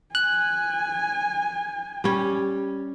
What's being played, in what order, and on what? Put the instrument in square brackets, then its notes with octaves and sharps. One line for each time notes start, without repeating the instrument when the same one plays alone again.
[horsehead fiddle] G#5 [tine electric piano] F#6
[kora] G3 C#4